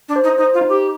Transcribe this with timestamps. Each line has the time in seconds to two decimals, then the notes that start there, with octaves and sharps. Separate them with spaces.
0.09 D4
0.16 C5
0.24 D#4
0.38 D#4 C5
0.54 F4
0.61 D#4
0.69 G4